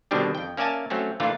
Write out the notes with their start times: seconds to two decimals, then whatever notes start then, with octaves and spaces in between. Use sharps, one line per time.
0.11 B2 D3 D#3 G3 C4 D4
0.35 F2 G5
0.57 A#3 C#4 D5 E5 G#5 A5
0.90 F#3 A3 C4 C#4
1.20 A#2 D3 E3 A3 D4 F4